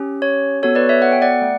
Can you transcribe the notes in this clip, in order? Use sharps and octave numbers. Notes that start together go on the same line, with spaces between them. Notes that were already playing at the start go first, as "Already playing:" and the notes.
Already playing: C#4 G4
C#5
B3 F#4 A4 C#5
B4 D5
C#5 E5
F#5
G5
D5 F#5
A3